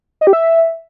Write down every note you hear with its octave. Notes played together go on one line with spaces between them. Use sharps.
D#5
G4
E5